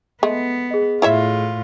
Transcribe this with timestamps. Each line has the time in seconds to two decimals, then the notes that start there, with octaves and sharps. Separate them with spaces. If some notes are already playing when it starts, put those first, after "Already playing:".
0.23 G#3 A3 B3
0.71 G#4 D#5
1.02 A2 E4 F4 C#5 E5